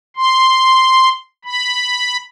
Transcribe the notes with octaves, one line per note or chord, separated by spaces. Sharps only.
C6
B5